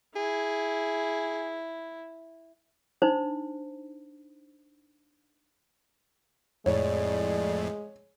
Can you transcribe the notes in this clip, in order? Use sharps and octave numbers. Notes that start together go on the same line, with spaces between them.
E4 G#4
D4 D#4 C5
F2 A2 G#3 C#5 D5